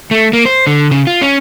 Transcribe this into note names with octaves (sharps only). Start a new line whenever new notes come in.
A3
A#3
C5
D3
C#3
F4
C#4